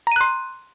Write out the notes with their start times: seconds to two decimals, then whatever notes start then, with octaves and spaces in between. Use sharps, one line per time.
0.07 A#5
0.12 D#7
0.16 F#6
0.21 C6